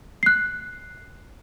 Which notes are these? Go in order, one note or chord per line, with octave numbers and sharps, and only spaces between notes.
F#6 C7